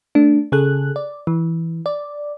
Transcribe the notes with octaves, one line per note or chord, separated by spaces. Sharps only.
A3 D4
C#3 G#4 A4 F#6
D5
E3
D5